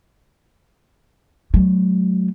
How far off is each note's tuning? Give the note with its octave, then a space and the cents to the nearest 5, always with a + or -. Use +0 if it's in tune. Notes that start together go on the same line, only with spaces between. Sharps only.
F#3 +0 A3 -35